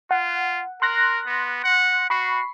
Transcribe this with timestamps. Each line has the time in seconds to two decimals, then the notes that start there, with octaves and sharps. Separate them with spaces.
0.11 F4 F#5
0.82 A#4 C6 F#6 A#6
1.26 B3
1.64 F#5
2.10 F#4 B5 C#6 C7